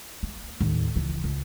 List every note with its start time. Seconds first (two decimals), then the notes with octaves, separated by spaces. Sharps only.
0.23 A#3
0.61 D#2 A2
0.96 C#2 E3
1.24 C#2